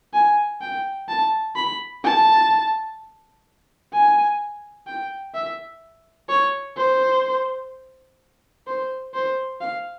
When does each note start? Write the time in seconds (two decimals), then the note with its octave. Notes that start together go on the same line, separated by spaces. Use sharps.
0.13 G#5
0.61 G5
1.08 A5
1.56 B5
2.04 A5
3.93 G#5
4.87 G5
5.34 E5
6.29 C#5
6.77 C5
8.67 C5
9.14 C5
9.61 F5